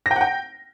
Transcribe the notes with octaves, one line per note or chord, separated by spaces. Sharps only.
A#6
G5
F#5
G5